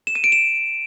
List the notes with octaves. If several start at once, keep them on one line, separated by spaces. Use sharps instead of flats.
E7
D#7
D7
E7